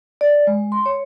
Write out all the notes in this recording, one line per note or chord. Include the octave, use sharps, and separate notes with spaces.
D5
G#3
C6
C#5